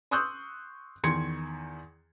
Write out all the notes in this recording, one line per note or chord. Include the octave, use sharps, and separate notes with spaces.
C6 C#6 D#6 E6 F#6 G6
E2 D#3 C6 G#6 C#7